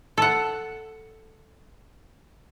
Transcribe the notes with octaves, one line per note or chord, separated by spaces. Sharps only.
A4 F#5